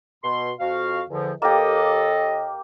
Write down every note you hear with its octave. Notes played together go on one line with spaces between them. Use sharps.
B2 C6
F2 F#4 F5
E2 D3 F3
D#2 A#3 G4 A4 D#5